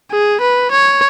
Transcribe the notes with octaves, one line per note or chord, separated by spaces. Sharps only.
G#4
B4
C#5